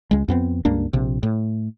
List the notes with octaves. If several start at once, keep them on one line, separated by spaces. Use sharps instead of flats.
C#2 G#3
F2 B3 C4
C#2 G2 A#3 D4
A#1 C3
A2